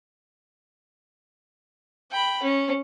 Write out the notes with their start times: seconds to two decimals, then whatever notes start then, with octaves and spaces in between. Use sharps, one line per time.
2.11 G5 B5
2.43 C#4